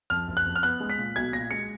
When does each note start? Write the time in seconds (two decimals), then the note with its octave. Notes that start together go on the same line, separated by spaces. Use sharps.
0.10 F2 F6
0.28 F#1
0.37 F#6
0.45 F2
0.56 F6
0.63 B3 F#6
0.80 G#3
0.90 B6
0.98 A#2
1.16 B1 G#6
1.33 A#2 A#6
1.51 G#3 C#7